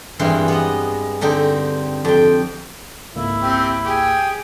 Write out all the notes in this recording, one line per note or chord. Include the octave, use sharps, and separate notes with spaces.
G2 E3 G#3 C4 A#4 C6
B3 D#5
D3 C4 D#4 G4
F2 G5
G#1 C#2 A#3 E4
C4 G4
G4 G#4 G5